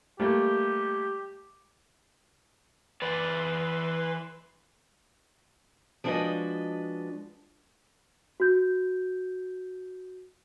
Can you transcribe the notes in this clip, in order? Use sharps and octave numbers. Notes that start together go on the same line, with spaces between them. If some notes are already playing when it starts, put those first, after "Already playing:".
G3 A3 A#3 G4
E3 B4 D5 C6
F3 G#3 D4 F#4 B4 D#5
F#4 G6